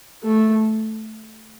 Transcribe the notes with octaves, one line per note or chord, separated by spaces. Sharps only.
A3